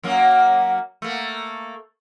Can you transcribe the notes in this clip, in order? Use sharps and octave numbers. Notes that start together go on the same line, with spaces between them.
F#2 F#3 A#3
A3 A#3